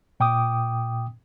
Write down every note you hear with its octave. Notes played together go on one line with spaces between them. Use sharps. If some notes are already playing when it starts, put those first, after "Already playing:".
A#2 G5 D6 D#6